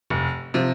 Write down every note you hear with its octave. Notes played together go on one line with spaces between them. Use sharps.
F1
C3 F3